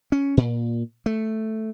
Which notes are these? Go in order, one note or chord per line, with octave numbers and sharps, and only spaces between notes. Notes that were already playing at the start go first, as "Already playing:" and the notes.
C#4
A#2
A3